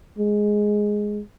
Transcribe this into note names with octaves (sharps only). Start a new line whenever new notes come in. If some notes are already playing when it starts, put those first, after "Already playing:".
G#3